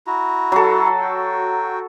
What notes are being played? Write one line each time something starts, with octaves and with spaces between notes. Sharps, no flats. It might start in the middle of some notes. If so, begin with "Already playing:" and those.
E4 F#4 A#5
F#3 A4
F#4 G5